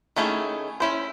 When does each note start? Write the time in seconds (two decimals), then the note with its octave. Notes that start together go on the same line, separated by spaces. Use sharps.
0.16 D#3 A3 C#4 E4 G#4
0.80 C#4 E4 C5